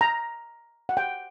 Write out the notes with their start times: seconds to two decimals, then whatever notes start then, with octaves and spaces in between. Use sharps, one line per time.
0.01 A#5
0.89 F#5
0.97 G5